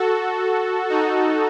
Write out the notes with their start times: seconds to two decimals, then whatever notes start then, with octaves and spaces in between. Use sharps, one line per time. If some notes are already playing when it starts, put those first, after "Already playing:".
Already playing: F#4 A4
0.89 D#4 F#4